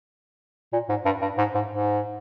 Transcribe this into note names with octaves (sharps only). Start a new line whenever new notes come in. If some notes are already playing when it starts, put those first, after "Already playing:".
A#2
G#2
G2
G2
G#2
G#2
G#2